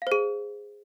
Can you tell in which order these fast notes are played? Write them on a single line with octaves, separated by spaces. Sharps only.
F5 C5 G#4